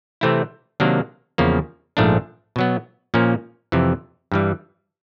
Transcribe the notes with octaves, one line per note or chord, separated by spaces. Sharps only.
C3 E3 A3 C4 E4
C3 D#3 F#3 A#3 D4
E2 C#3 F3 A#3
A#1 G#2 F3 A3 D4
B2 F#3 B3
A#2 F3 A#3 C#4
F2 C3 E3
G2 E3 G3